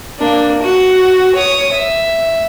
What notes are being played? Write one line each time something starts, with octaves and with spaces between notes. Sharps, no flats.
A#3 D4
F#4
C#5 D#6
E5